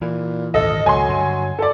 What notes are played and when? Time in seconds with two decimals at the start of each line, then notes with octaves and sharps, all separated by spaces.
0.02 A#2 E3
0.54 D#1 G#1 D2 A4 D#5
0.86 C#2 F#3 G#5 C6
1.09 G2 D3
1.59 A4 D5